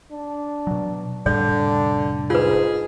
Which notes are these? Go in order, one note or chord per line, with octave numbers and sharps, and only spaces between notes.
D4
B2 F#3
F1 A2 D3 G3 D4 D5
G#2 F4 G#4 B4